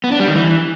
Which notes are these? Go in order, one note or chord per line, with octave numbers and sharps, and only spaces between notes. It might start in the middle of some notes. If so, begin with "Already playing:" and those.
B3
D4
G3
D#3
E3